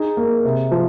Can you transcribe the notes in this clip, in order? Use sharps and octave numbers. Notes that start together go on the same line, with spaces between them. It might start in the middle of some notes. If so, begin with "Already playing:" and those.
Already playing: D#4 G#4
A#3
C3
F3